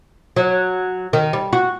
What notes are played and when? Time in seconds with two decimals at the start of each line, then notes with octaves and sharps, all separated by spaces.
0.36 F#3
1.13 D#3
1.33 G3
1.53 F#4